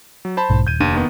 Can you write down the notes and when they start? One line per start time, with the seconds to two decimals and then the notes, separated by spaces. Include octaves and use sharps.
0.25 F#3
0.37 C5 A5 B5
0.50 B1 G#2
0.67 D#1 G6 G#6 D#7
0.80 F1 D#2 D4 D#7
0.94 D#3 A#3 B3